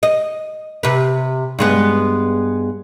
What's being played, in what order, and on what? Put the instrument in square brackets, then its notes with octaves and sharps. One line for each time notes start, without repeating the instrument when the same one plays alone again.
[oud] D#5
C3 B4
G2 G#3 B3